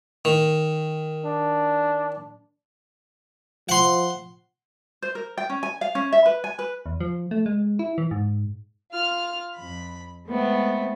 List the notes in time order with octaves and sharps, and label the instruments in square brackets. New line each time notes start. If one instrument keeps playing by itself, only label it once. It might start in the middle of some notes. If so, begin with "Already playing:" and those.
[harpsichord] D#3
[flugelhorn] D4
[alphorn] F3 [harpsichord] F#5 C6
[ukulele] C5
A#4
G5
C#4
G#5
F5
C#4
E5
B4
G#5
B4
[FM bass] E2
F3
A3
G#3
E4
E3
G#2
[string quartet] F4 F6
F2 B5
G#3 A3 B3 C4 E4